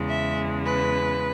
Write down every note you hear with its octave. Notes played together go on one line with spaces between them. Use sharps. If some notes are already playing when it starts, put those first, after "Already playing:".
Already playing: E2 C#3 G#3
E5
B4